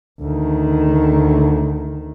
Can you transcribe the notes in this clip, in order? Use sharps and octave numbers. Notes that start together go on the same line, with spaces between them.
D2 D#3